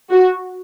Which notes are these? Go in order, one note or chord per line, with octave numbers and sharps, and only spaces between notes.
F#4